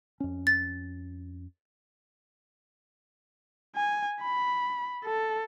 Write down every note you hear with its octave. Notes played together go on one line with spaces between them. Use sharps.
F2 C#4
A6
G#5
B5
A4